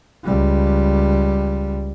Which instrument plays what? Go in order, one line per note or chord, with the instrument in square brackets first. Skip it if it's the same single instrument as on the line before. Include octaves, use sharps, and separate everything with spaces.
[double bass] C#2 G3